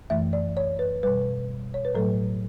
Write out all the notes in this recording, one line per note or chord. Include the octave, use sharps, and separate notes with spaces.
F#2 E3 A3 E5
D5
C#5
B4
B2 G3 B4
C#5
B4
A2 F#3 A3 A4